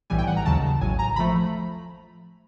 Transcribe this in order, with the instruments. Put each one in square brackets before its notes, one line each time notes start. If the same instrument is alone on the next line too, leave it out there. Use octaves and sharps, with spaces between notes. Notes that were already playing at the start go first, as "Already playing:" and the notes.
[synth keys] B1 A2 E3 G3 G#5
G5
F#5
A#5
D#2 C#3 F#3 A5
A1 A2 F#3 G#5
A#5
F3 A3 B5